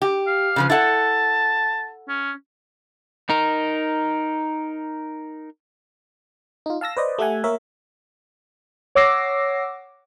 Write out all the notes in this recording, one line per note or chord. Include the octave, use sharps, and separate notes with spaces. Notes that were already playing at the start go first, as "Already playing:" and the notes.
G4
F5
C#3 F3 B4
E4 A4 F#5 A5
C#4
D#4 A#4
D#4 F4
F5 A5 E6 A#6
B4 C5 D5 D#5
A3 G4 E5 F#5 G#5
A#3 A#4 C#5 E5
C#5 F#5 D6 E6 A#6 C7